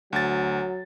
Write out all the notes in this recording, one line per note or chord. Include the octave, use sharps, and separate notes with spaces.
D2 F#3 A6